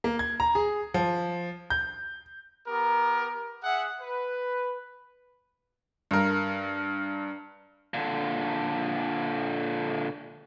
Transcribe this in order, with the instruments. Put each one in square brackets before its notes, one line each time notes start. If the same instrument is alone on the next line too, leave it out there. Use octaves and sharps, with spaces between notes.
[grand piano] A#3
G#6
A#5
G#4
F3
G6
[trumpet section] B3 G4 A#4
G#4 E5 F#5
B4
[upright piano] G2 A#4
[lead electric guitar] A#2 D3